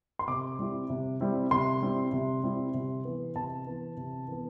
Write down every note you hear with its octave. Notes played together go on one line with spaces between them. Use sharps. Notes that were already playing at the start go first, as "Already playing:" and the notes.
C6
C3 D6
G3 C4 E4
C3
G3 C4 E4
C3 C6
G3 C4 E4
C3
G3 C4 E4
C3
E3 B3
C3 A5
E3 B3
C3
E3 B3